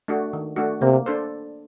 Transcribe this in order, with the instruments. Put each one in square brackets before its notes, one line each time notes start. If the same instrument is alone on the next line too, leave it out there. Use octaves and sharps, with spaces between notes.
[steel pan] A3 D4 F#4
D#3
A3 D4 F#4
[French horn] C3 [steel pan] A#3
[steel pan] D4 A4 C5